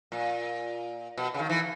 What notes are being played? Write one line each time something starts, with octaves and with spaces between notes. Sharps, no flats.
A#2
B2
C#3
D#3
E3